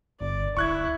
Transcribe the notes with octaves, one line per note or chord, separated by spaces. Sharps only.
G1 D5
D1 E4 C#6 F#6 G#6